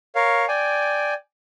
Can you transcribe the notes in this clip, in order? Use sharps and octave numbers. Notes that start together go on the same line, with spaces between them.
A#4 C#5 F5
D5 G5 G#5